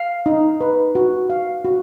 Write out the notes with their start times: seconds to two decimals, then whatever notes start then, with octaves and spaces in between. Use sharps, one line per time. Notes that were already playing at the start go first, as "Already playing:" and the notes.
Already playing: F5
0.26 D#4
0.61 B4
0.95 F#4
1.30 F5
1.65 F#4